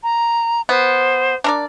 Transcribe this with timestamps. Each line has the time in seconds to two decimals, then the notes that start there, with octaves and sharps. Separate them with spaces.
0.03 A#5
0.69 B3 C5
1.44 D4 A#4 D5